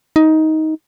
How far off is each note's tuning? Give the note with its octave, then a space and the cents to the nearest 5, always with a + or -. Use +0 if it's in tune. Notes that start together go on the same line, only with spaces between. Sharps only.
D#4 +15